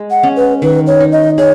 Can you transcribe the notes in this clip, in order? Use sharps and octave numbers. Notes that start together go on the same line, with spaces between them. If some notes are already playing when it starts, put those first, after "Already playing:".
Already playing: G#3
F#5
C#4
B4
D#3 B4
C#5
D#4
D#5
G#4 C#5